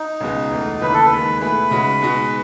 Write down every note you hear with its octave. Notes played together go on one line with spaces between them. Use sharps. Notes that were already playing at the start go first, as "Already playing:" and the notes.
Already playing: D#4
C#2 B2 G#3
E2 B2 A3
D#2 C#3 E3 B4
A4
B4
D#2 D#3 G#3
B2 A3 E4 G#4 B4
C#3 G#3 D#4 F#4
B2 G#3 D#4 F#4